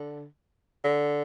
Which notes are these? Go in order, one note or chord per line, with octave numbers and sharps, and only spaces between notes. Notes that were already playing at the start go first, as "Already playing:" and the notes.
Already playing: D3
D3